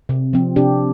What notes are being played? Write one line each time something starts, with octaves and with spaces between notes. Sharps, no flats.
C3
F3 C4
C3 D4 G4